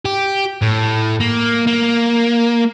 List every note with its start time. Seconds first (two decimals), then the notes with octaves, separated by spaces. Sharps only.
0.05 G4
0.62 A2
1.20 A#3
1.67 A#3